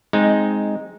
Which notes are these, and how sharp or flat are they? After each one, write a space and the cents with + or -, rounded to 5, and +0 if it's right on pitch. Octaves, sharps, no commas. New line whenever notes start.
G#3 +0 C4 +0 D#4 +0